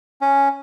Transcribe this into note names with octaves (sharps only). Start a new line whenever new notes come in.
C#4